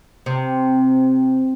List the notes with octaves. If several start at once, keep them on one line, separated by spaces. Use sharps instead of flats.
C3